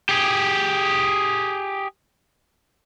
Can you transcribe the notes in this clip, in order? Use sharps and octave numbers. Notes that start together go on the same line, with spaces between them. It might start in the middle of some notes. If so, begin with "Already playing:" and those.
G4 G#4